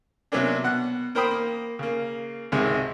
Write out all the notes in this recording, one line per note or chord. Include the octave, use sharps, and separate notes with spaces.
C3 F#3 A#3 B3 C#4 D4
B2 F#5 F#6
A#3 A#4 C5 G5 B5 D#6
A#3
C#3 A#3
G#1 C#2 C3 D#3 G#3